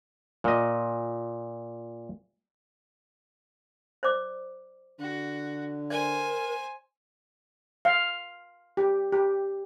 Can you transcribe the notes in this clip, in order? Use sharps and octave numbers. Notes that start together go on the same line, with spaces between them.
A#2 D#5
C5 D5 D6
D3 F#4
A#4 C5 D5 G#5
F5
G4
G4